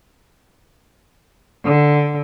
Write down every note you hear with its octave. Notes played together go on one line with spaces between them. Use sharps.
D3